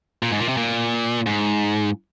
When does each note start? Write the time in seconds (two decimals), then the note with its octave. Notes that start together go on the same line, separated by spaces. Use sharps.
0.23 A#2
0.31 G#2
0.40 A#2
0.49 C3
0.57 A#2
1.26 G#2